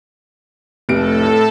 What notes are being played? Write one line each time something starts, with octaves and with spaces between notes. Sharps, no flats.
F1 A2 A4 D7